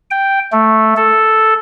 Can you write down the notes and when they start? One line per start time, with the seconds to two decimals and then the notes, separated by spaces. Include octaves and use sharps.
0.11 G5
0.52 A3
0.97 A4